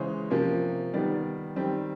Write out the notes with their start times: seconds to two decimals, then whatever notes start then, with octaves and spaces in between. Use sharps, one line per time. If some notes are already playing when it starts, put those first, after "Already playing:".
Already playing: C#3 E3 G#3 C5 C#5
0.31 C3 F3 A#3 C#4
0.93 D#3 G3 B3 D5
1.56 D#3 G3 C4